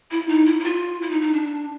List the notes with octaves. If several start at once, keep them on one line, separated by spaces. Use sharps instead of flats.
E4
D#4
E4
E4
F4
E4
D#4
D#4
D4